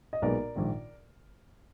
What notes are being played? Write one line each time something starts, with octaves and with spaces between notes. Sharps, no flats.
D#5
B1 A#2 G#3 B3 A#4 D5
A#1 G#2 D#3